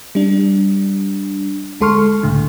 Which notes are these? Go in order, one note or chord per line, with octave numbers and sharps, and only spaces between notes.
G3 D4
D2 G#3 A4 C6 C#6 F6
C#2 A2 D3